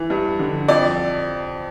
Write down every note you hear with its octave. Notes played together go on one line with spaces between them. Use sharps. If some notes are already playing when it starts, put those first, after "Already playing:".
Already playing: E3
G2
D3
F2 D5